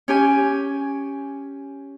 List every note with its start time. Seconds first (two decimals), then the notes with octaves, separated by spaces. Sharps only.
0.08 C#4 G4 G#5